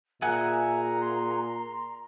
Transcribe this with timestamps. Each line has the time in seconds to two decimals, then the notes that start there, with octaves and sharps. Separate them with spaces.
0.22 A#2 G#4 E5 F#5 G#5 A#5
1.02 C6